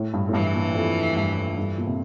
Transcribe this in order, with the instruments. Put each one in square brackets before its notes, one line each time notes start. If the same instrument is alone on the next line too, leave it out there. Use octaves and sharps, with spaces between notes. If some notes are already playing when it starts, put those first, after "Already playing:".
Already playing: [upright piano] A2
G2
A2
[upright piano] G2 [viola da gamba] E3
[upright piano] A#2
F2
G2
G2
A#2
C3